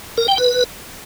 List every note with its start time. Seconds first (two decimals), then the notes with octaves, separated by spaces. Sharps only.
0.18 A#4
0.28 G5
0.38 B4